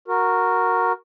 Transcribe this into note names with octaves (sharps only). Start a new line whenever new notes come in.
F#4 A#4